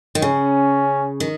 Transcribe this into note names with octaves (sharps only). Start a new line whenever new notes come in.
D#3
C#3 C#4
D#3